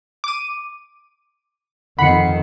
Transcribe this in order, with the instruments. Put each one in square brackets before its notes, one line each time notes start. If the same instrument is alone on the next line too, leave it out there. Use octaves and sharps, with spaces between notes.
[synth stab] D6 D#7
[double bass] F2 D#3 [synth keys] F#5 C7 C#7 [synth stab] B5